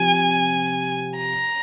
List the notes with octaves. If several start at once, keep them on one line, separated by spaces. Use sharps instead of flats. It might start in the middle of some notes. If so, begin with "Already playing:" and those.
Already playing: C3 F3 G#5
A#5